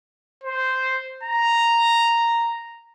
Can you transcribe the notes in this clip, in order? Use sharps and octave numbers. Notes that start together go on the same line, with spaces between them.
C5
A#5